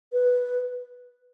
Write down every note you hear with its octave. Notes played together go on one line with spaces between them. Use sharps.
B4